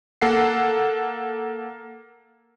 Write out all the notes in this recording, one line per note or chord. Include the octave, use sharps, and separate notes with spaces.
A#3 A4 F#5 C7